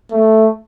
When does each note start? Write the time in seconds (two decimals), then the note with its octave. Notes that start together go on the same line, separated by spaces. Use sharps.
0.11 A3